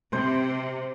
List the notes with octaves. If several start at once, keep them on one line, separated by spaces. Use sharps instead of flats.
C3 C5